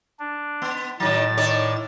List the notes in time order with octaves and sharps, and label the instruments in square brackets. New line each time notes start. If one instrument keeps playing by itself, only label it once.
[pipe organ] D4
[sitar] B3
[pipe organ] A2 A6 [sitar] D#3 F#3
[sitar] D#3 C#5 D5